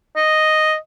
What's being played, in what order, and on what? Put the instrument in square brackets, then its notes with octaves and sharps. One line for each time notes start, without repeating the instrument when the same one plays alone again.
[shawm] D#5